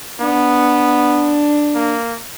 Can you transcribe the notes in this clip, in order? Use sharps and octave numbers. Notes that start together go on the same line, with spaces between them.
B3 D4
A#3